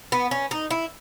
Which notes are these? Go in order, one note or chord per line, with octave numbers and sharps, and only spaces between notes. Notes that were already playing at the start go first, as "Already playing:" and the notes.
B3
C#4
D#4
E4